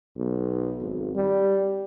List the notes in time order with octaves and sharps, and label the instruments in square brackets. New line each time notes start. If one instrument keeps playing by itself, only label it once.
[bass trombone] B1
G#1
G3